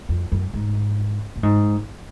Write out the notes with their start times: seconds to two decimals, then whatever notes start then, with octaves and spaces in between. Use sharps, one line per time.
0.09 F2
0.32 F#2
0.54 G#2
1.36 A#2
1.43 G#2